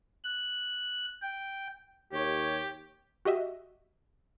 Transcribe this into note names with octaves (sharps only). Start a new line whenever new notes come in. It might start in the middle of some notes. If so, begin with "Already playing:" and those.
F#6
G5
D#2 G4 C#5
F#4 G4 D#5 E5